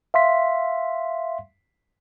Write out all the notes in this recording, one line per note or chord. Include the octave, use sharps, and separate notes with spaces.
E5 F5 C6 B6